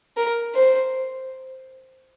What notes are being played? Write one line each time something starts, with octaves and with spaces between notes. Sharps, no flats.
A#4
C5